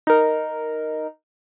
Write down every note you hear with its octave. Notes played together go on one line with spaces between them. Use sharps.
D#4 A#4